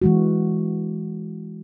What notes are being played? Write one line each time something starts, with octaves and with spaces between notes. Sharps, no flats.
E3 G#3 F#4